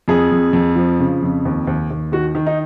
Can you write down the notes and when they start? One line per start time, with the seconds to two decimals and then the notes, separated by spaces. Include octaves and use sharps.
0.08 F2 G#4
0.31 F2
0.53 F2
0.76 F3
1.00 C#3
1.22 F2
1.45 D#2
1.67 D#2
1.90 D#2
2.12 D#3 F#4
2.35 D#3
2.46 D#4